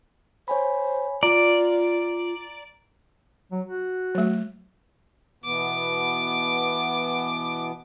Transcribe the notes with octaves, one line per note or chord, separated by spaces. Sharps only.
C5 C#5 G#5 B5
F4 D5 A#5
F#3
F#4
F#3 A3
B2 E3 B3 D6